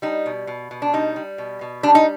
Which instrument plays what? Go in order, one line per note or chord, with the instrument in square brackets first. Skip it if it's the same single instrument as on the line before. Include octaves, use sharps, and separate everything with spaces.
[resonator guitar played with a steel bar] G3 D#4
B2
B2
B2
D4
G3 D#4
G3
B2
B2
G3 D4
D#4